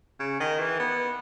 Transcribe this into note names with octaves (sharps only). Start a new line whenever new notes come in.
C#3
D#3
E3
B3